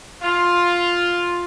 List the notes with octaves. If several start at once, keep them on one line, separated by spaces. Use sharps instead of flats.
F4